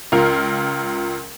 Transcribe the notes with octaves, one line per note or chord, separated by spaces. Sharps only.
C#2 F4 A#4 F6